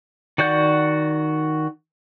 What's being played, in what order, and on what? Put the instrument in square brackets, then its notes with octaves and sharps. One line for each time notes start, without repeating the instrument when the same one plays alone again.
[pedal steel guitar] D#3 F#4 D5 F#5 G6